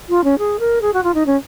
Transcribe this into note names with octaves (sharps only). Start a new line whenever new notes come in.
F4
C#4
G#4
A#4
G#4
F#4
F4
D#4
C#4